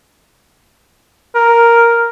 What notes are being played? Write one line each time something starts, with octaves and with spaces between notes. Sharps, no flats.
A#4